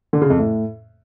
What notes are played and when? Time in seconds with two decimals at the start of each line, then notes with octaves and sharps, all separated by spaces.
0.13 D3
0.22 C#3
0.30 F2
0.39 A2